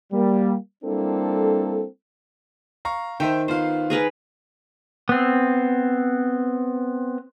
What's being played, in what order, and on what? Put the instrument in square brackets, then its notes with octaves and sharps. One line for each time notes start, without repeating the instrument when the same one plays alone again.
[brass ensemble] G3 A#3
G3 A#3 C4 D4 E4 A4
[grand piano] F5 A#5 C#6
[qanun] D#3 [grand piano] C5 E5 G5
[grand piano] B3 F4 F5 [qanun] C5
[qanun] G#4 A#4 B4
[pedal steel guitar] B3 C4